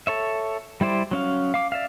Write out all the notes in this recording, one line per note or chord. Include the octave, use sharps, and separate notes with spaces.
A4 C#5 E5
G3 E4 C5 D5
F#3 C#4 F5
F5 D6
D5 E5 F5